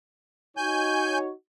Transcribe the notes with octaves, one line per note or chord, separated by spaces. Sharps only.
D#4 F#4 C#5 G#5 G6